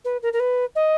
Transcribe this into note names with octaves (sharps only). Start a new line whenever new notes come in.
B4
A#4
A#4
B4
D#5